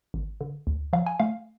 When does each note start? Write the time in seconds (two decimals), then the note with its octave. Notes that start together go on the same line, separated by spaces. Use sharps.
0.14 G#1
0.41 D3
0.67 D2
0.93 F3 F5
1.06 G#5
1.20 A3 F5